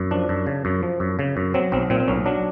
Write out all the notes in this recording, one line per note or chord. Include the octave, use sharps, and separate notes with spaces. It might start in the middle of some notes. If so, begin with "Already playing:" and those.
Already playing: F#2
F3 D4
F#2
C#3
F#2
F3
F#2
C#3
F#2
F#3 C4
B1 C4
A#2 C4
C4
B1 C#4
F#3 D4